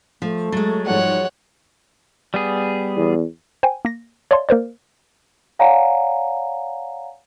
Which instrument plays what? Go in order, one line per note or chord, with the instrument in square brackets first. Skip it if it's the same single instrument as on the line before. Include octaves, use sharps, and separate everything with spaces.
[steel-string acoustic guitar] F3 [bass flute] A3
[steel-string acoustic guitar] F#3 G#3 [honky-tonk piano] A6
[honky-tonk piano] G#2 F3 G3 [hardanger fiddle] C#5 F#5
[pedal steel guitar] G3 B3 G#4
[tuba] E2
[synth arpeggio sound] C5 G5 G#5
A#3 A#6
C#5 D5 E5 F5 A5 C6
A#3 A#4 C5 D5
[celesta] C#5 D5 F5 F#5 G#5 A#5